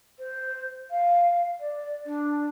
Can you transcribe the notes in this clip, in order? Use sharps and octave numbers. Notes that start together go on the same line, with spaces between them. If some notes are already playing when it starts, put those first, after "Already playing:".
C5
F5
D5
D4